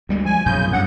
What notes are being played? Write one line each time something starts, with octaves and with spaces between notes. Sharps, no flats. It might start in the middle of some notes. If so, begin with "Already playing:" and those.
D2 G3 G#3
F3 G#5
B1 F#2 A#2 C#3 G6
G2 F#3 F#5